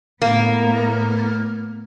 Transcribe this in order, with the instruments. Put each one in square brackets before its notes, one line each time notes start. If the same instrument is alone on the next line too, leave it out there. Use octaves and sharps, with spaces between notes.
[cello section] A2 B3 [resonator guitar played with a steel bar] A#3